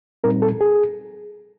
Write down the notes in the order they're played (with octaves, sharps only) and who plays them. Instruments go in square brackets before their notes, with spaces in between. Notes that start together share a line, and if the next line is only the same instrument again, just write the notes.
[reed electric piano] A#2 G3 C4 D#4 A#4
A4
G#4